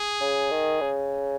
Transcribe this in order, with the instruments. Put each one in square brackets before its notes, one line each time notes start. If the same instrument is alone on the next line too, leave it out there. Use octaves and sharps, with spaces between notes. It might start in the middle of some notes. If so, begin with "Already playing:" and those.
Already playing: [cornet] G#4
[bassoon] C#3
D#3
C#3